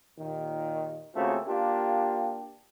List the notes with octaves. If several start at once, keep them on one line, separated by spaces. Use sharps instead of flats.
D#2 A#2 D#3
C#3 A3 A#3 C4 F4 F#4
A#3 D4 F4 G4